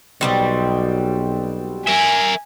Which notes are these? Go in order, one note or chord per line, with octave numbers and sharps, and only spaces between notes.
B1 B2 G3 C4
A#4 E5 G#5